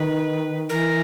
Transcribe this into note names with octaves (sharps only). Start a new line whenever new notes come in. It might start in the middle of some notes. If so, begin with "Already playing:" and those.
Already playing: D#3 B4
E3 A#4